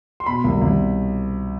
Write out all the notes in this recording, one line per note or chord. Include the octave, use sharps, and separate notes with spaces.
C6
B2 B5
C2
C2